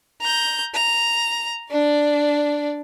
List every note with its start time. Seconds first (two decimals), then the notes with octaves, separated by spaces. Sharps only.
0.21 A#5 G6
0.75 A#5
1.71 D4 D5